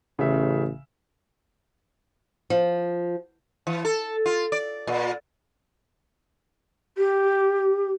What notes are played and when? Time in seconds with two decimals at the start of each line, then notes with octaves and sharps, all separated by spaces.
0.19 A1 C#3 E5
2.50 F3
3.67 E3
3.85 A4
4.26 F4
4.52 D5
4.87 A#2
6.97 G4